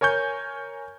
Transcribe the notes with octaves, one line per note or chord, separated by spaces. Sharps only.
A#4 C#5 G#5 C#6 G6